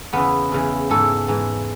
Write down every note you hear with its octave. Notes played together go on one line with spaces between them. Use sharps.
E2 C#3 E3 B3
E2 C#3 E3
G#2 E3 A4
G#2 E3